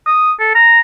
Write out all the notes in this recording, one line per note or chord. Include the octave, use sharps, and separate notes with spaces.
D#6
A4
A#5